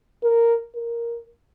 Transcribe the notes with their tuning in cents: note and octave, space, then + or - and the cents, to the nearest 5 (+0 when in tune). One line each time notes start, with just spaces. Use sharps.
A#4 -5
A#4 +5